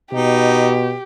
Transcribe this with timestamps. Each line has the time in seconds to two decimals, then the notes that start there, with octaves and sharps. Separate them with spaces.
0.13 B2 D#4 G4